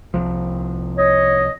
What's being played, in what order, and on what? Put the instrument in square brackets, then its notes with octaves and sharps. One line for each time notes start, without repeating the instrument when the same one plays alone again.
[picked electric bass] C2 F3
[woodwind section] C#5 D#5